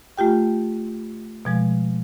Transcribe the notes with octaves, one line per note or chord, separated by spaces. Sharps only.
A3 F4 G4 G5
B2 F3 G#3